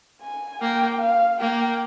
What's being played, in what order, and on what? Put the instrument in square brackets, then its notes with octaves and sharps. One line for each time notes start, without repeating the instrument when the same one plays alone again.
[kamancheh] G#5
[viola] A#3 [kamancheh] G5
[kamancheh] F5
[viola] A#3 [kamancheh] G5